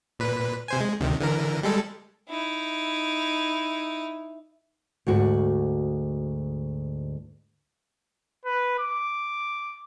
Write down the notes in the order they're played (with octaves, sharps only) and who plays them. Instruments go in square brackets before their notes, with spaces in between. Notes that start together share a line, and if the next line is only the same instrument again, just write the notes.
[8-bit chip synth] A#2 B4
C3 C5 G#5
G#3
D2 C3 D#3
D3 E3 A#4
G3 G#3 A4
[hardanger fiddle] D#4 E4
[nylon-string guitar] D2 G#2 F#4
[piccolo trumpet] B4
D6